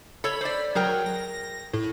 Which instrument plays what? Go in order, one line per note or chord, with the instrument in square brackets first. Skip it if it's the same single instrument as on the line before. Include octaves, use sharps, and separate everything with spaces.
[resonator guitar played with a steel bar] A4 C#5 [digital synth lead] B5
[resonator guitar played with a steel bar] C5 D5
[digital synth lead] F#3 [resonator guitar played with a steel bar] G#4 A#4 G5
[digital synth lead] A#6
A2